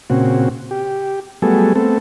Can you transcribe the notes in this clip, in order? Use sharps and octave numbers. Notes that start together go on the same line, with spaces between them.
A#2 C#3 C4 F#4
G4
F#3 G3 A3 B3 G#4 A4
A3 B3 C4 A4